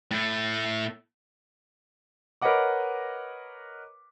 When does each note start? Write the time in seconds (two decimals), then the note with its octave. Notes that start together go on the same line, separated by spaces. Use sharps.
0.11 A2 A3
2.42 A#4 B4 C#5 D#5 F#5 D6